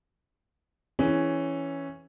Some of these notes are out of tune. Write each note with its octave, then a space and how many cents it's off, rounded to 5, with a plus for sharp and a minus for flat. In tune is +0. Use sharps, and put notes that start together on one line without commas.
E3 +0 C#4 +0 G#4 +0